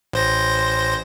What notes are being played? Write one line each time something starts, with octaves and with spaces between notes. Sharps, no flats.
A1 C5 A#6